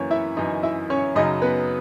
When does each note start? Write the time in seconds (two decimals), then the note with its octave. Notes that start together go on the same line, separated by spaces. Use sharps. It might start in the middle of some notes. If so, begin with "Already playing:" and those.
Already playing: F#2 E3 A#3 C#4 A#4 C#5
0.11 E4 E5
0.37 F#2 E3 D#4 D#5
0.63 E4 E5
0.90 C#4 C#5
1.16 F#2 C#3 F#3 D#4 D#5
1.42 B3 B4